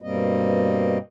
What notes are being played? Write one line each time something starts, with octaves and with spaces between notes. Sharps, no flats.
G2 B2 G3 A#3 C4 D#5